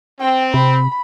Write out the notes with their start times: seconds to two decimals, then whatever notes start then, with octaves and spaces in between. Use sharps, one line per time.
0.20 C4 G5
0.54 C3 B5